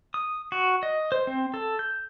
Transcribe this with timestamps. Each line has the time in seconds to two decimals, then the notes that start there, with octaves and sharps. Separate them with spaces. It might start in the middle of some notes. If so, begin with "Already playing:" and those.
0.14 D#6
0.52 F#4
0.83 D#5
1.12 C5
1.27 C4
1.54 A4
1.79 G6